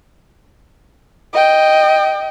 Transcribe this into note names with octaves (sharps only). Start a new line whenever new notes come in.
D#5 G5